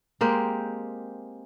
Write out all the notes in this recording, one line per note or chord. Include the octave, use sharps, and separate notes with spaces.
G#3 A#3 C4 G4